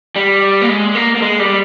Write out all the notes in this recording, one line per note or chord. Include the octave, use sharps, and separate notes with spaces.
G3
A#3
G#3
A#3
A#3
G#3
G3